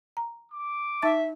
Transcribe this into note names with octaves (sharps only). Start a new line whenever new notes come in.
A#5
D6
D#4 E5 A5 A6